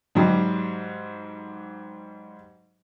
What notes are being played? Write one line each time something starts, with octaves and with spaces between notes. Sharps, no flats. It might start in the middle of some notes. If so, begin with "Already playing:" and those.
G#2 F#3 G3